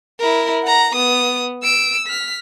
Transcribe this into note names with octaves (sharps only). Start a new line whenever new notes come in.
E4 A#4
F#5 A#5
B3 D#6
E6 D7
F6 B6